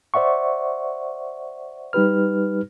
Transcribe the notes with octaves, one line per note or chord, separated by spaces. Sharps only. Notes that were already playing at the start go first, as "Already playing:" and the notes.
C5 D5 E5 F#5 C#6
G3 D#4 G4 B4 F6